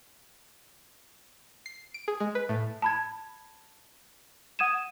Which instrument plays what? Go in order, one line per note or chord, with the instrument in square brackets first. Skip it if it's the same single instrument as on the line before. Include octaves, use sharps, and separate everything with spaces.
[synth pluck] C7
D7
G#4
G#3
B4
A2
[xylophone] A5 B5 G#6
F#5 D#6 G#6 D#7 E7